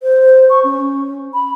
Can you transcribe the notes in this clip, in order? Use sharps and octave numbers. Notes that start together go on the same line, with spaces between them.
C5
C#6
C#4
B5